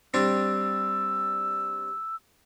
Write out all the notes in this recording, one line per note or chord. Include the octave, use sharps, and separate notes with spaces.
G3 C4 D4 E6